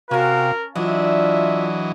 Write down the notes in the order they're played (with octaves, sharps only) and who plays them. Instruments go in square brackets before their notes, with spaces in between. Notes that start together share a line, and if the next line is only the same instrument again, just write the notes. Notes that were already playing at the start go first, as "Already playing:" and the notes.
[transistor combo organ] C3 [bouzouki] C#4 A5 [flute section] F#4 F5 G5 [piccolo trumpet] A#4
[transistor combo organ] E3 F#3 D#5 [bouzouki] D4 [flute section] F4 [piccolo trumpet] E5